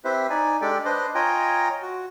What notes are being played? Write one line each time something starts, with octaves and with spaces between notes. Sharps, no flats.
C4 E4 G4 B4 C5 E5
D#4 D5 G#5
G#3 D4 G4 A4 D5 G5
D4 B4 C5 D#5
F4 C#5 D#5 G5 G#5 A#5
F#4